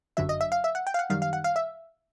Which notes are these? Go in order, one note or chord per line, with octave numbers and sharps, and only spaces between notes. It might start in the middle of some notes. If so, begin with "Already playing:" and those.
G1 F#2 D3 F#3 E5
D#5
E5
F5
E5
F#5
G5
F5
F#5
F#2 D#3 G3 F5
F5
F#5
F5
E5